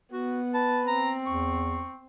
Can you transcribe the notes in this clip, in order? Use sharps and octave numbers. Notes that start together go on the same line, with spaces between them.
B3 F#4
B4 A5
C4 A#5
E2 C#6